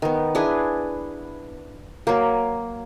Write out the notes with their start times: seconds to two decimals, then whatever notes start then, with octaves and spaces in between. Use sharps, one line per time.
0.02 D#3 B3
0.35 D4 E4 G#4 B4
2.07 F#3 A#3